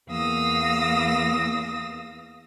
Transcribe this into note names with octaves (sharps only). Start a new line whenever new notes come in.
E2 A#3 F5 D#6 E6 A#6